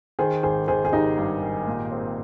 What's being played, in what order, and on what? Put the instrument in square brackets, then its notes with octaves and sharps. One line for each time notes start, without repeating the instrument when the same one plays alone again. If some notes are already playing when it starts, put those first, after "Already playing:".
[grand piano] D#3 [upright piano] G#4 C5
[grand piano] G#1 [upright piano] G#4 C5
[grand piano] D#3 [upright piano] G#4 C5
[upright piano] G#4
[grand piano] G#1 [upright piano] D#4 G4
[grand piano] G2
G#1
A#2
C4